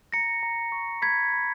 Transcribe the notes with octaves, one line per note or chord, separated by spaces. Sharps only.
A#5 A#6 C#7
A#5
C#6
B5 G#6 B6
B5